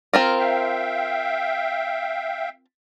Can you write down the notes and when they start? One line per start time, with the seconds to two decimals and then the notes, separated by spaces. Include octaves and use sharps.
0.13 C4 F4 A#4
0.39 E5 F5 G5